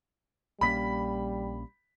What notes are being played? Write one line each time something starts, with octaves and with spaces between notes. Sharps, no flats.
A#1 G3 A#3 C#4 B5 B6